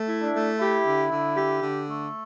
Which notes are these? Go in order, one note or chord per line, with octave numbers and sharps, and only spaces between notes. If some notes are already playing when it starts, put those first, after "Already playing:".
Already playing: A3
E4
D4
A3
E4 G4
D3
D3
G4
D3
A3